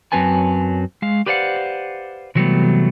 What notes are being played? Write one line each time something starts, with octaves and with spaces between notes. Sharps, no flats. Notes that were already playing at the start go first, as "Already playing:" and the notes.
F#2 F#3 C4 B4 G#5 A5
G#3 F5
G4 B4 C5 D5 F5 F#5
C3 E3 F#3 G3 A3 B3